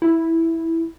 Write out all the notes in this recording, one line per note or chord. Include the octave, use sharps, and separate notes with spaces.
E4